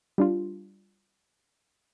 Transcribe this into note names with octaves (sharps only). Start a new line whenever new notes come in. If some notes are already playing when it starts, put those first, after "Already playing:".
G3 D4 F4